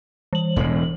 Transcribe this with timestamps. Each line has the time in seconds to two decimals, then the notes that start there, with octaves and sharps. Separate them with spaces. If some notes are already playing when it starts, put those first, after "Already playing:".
0.33 E3 F#7
0.56 E1 A2